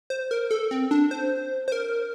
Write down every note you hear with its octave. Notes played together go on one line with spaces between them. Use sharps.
C5
A#4
A4
C4
D4
C5
C5
A#4